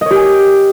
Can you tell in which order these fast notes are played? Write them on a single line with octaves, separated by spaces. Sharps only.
D#5 C#5 G4 G#5